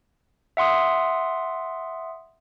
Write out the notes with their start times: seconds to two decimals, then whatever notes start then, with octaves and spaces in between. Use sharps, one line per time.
0.57 E5 F#5 C6 D#6